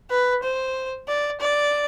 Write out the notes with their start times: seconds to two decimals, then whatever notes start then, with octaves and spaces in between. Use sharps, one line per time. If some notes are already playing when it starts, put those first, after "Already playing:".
0.10 B4
0.43 C5
1.08 D5
1.40 D5